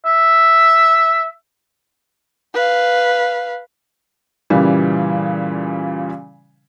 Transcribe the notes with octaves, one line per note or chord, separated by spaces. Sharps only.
E5
B4 F5
A#2 C#3 E3 G3